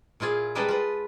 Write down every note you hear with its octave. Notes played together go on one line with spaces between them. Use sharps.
A#2 E4 F4 G#4
G3 G#3 A#4 B4 D#5 A5
F4 B4